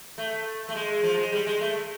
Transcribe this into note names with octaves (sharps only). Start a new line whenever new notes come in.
A3
A3
G#3
F3
G#3
G3
G#3
A3